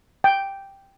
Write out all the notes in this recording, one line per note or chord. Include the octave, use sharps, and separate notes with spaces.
G5